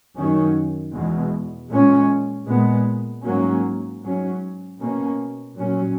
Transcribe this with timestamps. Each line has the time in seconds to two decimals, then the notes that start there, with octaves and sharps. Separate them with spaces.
0.16 F#2 D#3 F#3 C#4
0.94 E2 B2 G#3
1.71 A#2 G#3 C#4
2.48 A#2 G#3 B3
3.25 G#2 F#3 A#3 C#4
4.03 G#2 F#3 C#4
4.80 B2 A#3 C#4
5.57 A#2 F#3 C#4